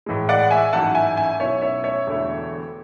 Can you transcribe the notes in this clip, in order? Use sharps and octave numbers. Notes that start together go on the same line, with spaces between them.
A2 E3 G#3
D5 F#5
E5 G#5
A1 G#2 F#3 C#4 E4 F#5 A5
E5 G#5
E5 G#5
B1 B2 F#3 C#4 E4 C#5 E5
C#5 E5
C#5 E5
E1 E2 D3 A3 E4